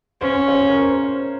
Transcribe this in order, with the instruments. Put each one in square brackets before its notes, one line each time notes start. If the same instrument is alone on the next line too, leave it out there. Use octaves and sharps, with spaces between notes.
[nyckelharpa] C#4 [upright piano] C5
[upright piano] C#5
C5
A#4
C5